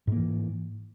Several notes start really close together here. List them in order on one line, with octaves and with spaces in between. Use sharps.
G#2 A#3 E3